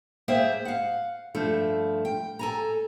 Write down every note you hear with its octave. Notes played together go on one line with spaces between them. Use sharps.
A#3 G#4 C5 E5 G5
F5 F#5
G2 F3 A3
G5
A4 G#5 A#5